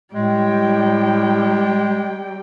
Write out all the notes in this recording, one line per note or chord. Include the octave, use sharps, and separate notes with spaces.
A2 G3 G#3 G5